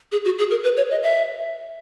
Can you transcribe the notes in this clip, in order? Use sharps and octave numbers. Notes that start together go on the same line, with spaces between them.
G#4
F#4
G#4
A#4
B4
C#5
D#5
E5